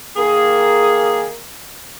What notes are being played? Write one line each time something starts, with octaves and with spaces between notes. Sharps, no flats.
D#3 A#3 G#4